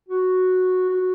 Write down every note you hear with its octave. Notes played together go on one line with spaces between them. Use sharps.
F#4
F#4